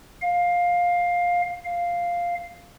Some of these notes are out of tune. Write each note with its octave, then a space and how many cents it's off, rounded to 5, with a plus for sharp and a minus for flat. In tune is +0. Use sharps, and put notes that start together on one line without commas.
F5 +15
F5 +0